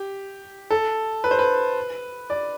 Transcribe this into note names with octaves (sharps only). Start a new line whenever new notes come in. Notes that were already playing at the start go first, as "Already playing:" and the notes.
Already playing: G4
A4
B4
C5
B4
D5